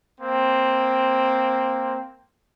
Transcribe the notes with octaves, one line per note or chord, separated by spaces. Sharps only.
A#3 C4